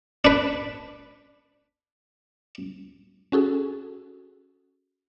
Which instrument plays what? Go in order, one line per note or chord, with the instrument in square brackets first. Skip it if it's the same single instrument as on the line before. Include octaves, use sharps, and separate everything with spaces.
[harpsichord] D4 B4
[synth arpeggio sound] C#4 F#4 G#4 A4